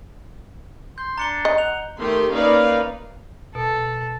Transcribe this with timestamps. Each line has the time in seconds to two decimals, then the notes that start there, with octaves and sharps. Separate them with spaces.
0.98 C6 G6
1.18 D4 A#5 C#7 G7
1.45 D#5
1.58 F#5 F7
2.00 D#3 A3 G4 C6
2.34 A#3 C#4 D#4 B4 D5 F5
3.55 B2 A4